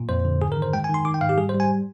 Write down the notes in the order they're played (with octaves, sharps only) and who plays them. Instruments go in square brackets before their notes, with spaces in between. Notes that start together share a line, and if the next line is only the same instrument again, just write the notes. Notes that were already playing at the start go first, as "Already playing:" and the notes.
Already playing: [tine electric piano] A#2
F2 C5
D3
G#2 G#4
A#4
D#3
C5
G#3 G5
G#5
D#3
C6
D#3 D6
G5
G#2 F5
G4
G3 G#4
C5
G3
G#5